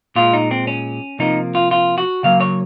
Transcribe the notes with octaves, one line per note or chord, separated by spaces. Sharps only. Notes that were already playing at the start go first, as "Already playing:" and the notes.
A#2 G#3 F4
D#4
C4
C#4
C3 F3 A#3 D#4
F4
F4
F#4
C#3 F#3 A#3 F5
C#5